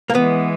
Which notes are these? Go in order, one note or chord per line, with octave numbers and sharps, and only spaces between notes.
A#3
E3 G#3 B3